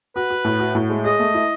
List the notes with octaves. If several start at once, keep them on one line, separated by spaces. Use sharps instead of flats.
F#4 B4
F#4
A2
F#4
A2
G#3
G#4 D#5
A3
E4